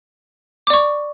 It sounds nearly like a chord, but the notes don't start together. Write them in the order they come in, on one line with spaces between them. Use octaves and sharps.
D6 D5 C#6